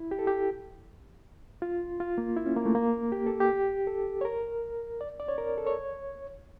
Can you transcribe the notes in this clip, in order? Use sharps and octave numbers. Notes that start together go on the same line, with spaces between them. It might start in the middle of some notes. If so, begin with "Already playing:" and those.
Already playing: E4
G4
A4
G4
F4
F4
A#3
E4
C#4
A#3
A3
A#3
G4
A4
G4
A4
C#5
A#4
D5
D5
C#5
A#4
A4
C#5